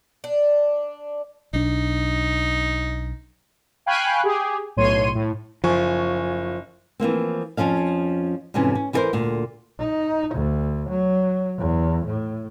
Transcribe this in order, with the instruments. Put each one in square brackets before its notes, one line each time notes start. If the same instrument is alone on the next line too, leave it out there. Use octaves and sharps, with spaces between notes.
[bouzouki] D4
[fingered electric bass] B1 D4 [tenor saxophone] D#4
[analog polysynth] F5 G5 G#5 B5 C#6 F#6
G4 G#4
B1 A2 C#5 C6 D#7
A2
[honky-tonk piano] F#1 G#5 C#6 [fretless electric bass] F3
[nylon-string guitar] E3 F3 A#3 C4
F2 D3 F3 C#4 F5
F2 G#2 C3 E3 C#4
C#4
E3 E4 G4 A4 A#4 C5
D2 A#2
[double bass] D#4
D2
F#3
E2
A2